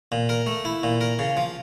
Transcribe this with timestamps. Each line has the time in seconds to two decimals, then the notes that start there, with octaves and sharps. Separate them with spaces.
0.12 A#2
0.29 A#4
0.47 A3
0.65 E4
0.83 A#2
1.01 A#4
1.19 C#3
1.37 F3